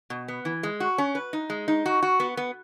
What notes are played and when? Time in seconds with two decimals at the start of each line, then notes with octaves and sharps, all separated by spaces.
0.10 B2
0.28 B3
0.45 E3
0.63 G#3
0.80 F#4
0.98 C#4
1.15 B4
1.33 D#4
1.50 G#3
1.68 D#4
1.86 F#4
2.02 F#4
2.20 B3
2.37 B3